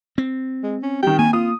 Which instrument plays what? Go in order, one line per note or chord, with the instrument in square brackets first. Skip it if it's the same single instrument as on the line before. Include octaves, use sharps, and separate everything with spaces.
[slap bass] C4
[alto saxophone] G#3
C#4
[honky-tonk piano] D#3 G3 [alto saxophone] G5
[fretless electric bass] A#3 [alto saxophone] G#5
[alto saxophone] F4 [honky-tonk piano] D#6